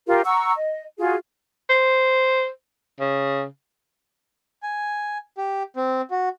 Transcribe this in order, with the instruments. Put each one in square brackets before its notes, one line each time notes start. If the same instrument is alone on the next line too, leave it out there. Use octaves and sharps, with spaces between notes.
[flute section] F4 G4 A#4
F#5 A#5 C#6 E6
D#5
F4 F#4 G#4
[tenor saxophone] C5
C#3
[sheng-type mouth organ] G#5
G4
C4
F#4